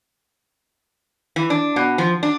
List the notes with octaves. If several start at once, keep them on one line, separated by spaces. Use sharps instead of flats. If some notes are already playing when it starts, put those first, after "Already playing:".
E3
D4
B2
F3
D4